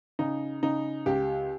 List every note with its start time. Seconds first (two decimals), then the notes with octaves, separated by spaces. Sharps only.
0.19 C#3 D#4
0.63 C#3 D#4
1.06 C#2 G4